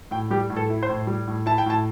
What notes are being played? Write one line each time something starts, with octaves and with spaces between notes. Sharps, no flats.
A2 G5
G3 G4
A2
A4
E4
C5
A2
G3
A2
E4 A5
G5
A2 A5